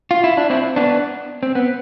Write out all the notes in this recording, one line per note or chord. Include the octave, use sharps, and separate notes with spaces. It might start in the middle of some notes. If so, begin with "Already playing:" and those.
F4
E4
D4
C4 E4
B3 D4
C4
B3